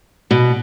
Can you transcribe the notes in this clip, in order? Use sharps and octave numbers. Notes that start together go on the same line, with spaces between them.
B2